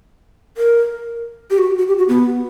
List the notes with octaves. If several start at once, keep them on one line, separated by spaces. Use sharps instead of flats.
A#4
G4
F#4
F#4
G4
F#4
B3